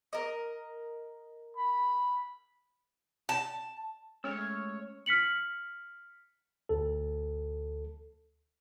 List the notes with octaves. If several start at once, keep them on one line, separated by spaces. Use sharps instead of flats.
A#4 D#5
B5
A5
G#3 A3 C#4 C#5 E6 F6
F6 B6 C#7 F#7
D2 A4